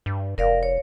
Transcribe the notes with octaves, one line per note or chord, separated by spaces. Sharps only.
G2
F1 A#4 D5 F5
C#5